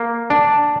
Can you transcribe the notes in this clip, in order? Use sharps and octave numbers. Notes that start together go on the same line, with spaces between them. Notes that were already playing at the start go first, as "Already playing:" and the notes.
Already playing: A#3
D4